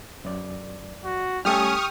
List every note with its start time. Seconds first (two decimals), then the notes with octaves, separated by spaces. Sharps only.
0.25 F#2 D5
1.04 F#4
1.45 G3 A3 C#4 G4 A4 C#6 D#6 F6